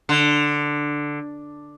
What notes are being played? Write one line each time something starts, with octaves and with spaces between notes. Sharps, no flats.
D3